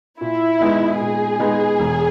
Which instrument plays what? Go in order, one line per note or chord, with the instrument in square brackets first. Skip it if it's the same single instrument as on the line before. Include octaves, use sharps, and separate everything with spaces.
[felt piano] A#2 [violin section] E4
[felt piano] G#3 B3 D#4
[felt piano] A#2 [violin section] G#4
[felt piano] G#3 B3 D#4
E1